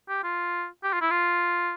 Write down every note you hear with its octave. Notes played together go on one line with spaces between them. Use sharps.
G4
F4
G4
F4
E4
F4